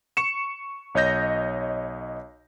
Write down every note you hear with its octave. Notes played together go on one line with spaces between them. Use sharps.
C#6 C#7 E7
B1 C#5 D#5 G6 A#6